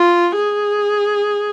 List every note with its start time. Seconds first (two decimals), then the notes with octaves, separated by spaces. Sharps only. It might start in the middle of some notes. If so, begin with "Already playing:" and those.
Already playing: F4
0.35 G#4